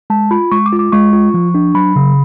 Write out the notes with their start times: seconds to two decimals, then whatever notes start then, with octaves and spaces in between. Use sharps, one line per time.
0.10 G#3 A5
0.31 F4 B5
0.52 G#3 C#6
0.66 D6
0.73 F4
0.79 D6
0.92 G#3 C#6
1.13 F4
1.34 F3
1.55 D4
1.75 F#3 B5
1.96 C#3